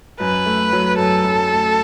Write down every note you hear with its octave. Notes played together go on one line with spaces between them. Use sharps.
F#2 B4
A3
F#3
F#2 A4
F#2
A3